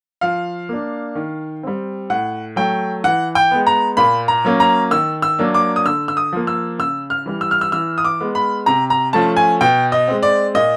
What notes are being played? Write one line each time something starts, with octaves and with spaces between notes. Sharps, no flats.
F3 F5
A#3 D4
D#3
G3 C4
A2 F#5
F#3 A3 G5
E3 F#5
G5
G#3 B3
A#5
A#2 B5
A#5
F#3 A#3 C#4
A#5
D#3 E6
E6
F#3 A#3 D4
D6
D#6
D3 E6
E6
D#6
F3 A#3
E6
C#3 E6
F6
E3 G3
E6
F6
E6
E3 E6
D#6
D6
G#3 B3
B5
C3 A#5
A#5
F3 A3 C#4 A5
G#5
B2 G5
D#5
G#3 C4
D5
A#2 D#5